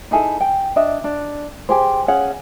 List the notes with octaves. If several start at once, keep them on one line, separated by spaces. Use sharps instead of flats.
D#4 E4 G#4 A4
G5
D4 D#5 E5
D4
G4 G#4 C5
C#4 G#4 F5 F#5